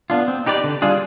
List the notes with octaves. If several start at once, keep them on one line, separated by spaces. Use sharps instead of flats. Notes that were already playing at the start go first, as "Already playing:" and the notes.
B3 D4 F4
C4
D#4 G4 B4 D5
D3
G3 D4 F4 G#4